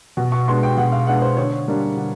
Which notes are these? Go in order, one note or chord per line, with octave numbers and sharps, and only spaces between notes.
B2
C#6
G#3 B3 D4 C6
G5
B2 F#5
F5
G#3 B3 D4 F#5
C5
D3 C#5
G3 A#3 D4
D3